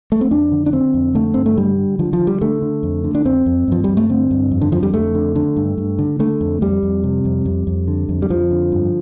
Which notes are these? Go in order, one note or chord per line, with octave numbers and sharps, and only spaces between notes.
A3
C4
F2 D4
D3
D4
D3 C4
F2
D3 A3
G2 C4
A3
D3 G3
D3
D3 F3
F3
D3
G3
D3 A3
D3
F2
D3
D4
F2 C4
F2
G2 F3
G2 G3
A3
D3 C4
G2
F2
D3
D3 F3
G3
F2 A3
D3
D3
G2
G2
D3
D3 A3
F2
F2 G3
F2
C3
F2
F2
F2
D3
F2
G3
F2 F3
D3
G2